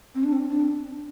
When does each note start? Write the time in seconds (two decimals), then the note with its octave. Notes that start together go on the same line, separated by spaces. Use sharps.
0.15 C4
0.24 D4
0.33 C4
0.50 D4